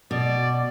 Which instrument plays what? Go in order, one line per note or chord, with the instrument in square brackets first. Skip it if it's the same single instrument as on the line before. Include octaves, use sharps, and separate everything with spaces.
[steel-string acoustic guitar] B2 [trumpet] D5